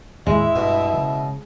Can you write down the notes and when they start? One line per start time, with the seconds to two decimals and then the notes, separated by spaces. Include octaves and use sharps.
0.27 D#2 A2 G#3 E4 E5
0.56 G2 B2
0.94 C#3